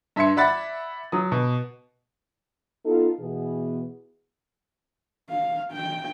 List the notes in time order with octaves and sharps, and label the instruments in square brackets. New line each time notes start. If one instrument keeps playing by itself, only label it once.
[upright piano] G2 E5 C6 G#6 C#7
D5 E5 F#5 B5 A6
F#3 D#6
B2
[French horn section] B3 D#4 F4 A4
B2 E3 B3 G#4
[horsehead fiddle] F5
G5